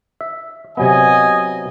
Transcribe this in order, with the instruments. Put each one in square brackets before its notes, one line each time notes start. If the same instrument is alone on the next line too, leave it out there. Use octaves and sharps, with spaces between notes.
[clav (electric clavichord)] E5
[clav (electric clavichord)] C3 F#3 B3 [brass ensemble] D#5 G#5